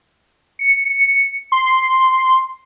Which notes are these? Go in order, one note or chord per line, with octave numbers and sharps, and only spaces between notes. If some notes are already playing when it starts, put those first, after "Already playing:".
C#7
C6